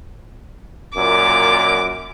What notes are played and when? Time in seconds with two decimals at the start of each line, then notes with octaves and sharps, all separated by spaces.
0.96 F#2 A#2 D6